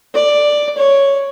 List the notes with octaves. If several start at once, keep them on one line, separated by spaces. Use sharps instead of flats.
D5
C#5